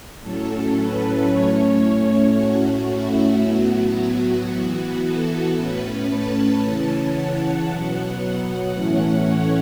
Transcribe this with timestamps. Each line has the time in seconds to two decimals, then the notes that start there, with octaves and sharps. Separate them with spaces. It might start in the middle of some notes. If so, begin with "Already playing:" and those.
0.21 A2 F#3 C#4 A4
0.75 B4
1.28 A2 A3 C#4 C#5
1.82 C#5
2.35 A2 A3 C#4 F#4
2.88 E4
3.41 A2 F#3 B3 F#4
3.95 F#4
4.48 E3 B3
5.01 A4
5.54 A2 A3 C#4 B4
6.07 A5
6.60 C#3 E3 C#4
7.14 F#5
7.67 B2 F#3 B3 F#5
8.73 A2 E3 A3 C#4
9.26 C#5